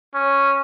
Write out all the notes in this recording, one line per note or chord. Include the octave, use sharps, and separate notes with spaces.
C#4